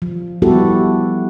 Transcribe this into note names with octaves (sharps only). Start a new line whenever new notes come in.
F3
G3 B3 E4 F#4 G4 A4